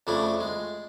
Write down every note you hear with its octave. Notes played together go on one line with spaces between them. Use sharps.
F2 C#3 A3 D4 E4
G#3